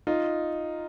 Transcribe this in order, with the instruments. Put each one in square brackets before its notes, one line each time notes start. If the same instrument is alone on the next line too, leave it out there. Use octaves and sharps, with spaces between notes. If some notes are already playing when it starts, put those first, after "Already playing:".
[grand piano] D#4 F4